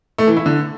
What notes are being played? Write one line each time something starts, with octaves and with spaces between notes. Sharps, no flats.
A3
E3
E4
D3